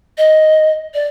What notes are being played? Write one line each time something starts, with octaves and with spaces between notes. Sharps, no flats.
D#5
D5